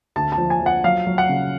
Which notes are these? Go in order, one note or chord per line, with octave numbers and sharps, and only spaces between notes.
D2 A5
A5
F3
G#5
F3
F#5
F#3 F5
F#3
F#5
C#3